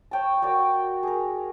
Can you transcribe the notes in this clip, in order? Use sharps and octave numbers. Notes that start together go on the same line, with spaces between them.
C#5 G5 A5
F#4 A#4 D5 G5
G#4 A#4